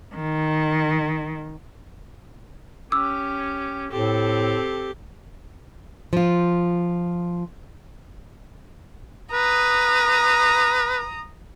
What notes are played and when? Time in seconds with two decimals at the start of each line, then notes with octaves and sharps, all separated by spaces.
0.16 D#3
2.92 C#4 G4 D6 E6
3.92 A2 C4 G4 A4
6.13 F3 F4
9.33 B4 A#5 D#6